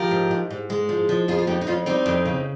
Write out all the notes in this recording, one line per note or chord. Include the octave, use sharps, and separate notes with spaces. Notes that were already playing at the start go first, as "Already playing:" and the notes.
Already playing: F3 G4 A#4
G#2
G#2
G#2
G#3
F3
F3
F2 F4 G#4
F4
F2 D#4 G4
D#4
F2 C#4 F4
G3 C4 D#4
F2
C#3